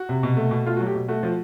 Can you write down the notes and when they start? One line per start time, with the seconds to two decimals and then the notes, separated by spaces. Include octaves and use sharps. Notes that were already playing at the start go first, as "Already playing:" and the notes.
Already playing: F#4
0.09 C3
0.23 B2
0.37 A3
0.51 B2
0.66 A3 F4
0.77 F#3 F#4
0.87 G4
0.95 B2
1.08 A3 F#4
1.23 F3